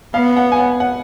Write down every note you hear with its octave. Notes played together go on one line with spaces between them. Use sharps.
B3 F5
F#5
G#5
F#5
F#5